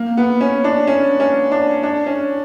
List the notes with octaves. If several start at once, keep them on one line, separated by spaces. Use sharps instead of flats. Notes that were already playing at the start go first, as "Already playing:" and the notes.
Already playing: A#3
B3
C#4
D4
C#4
C#4
D4
D4
C#4